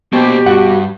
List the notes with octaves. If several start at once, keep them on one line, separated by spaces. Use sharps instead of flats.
B2 A#3 G4 C5
G2 F#4 F#5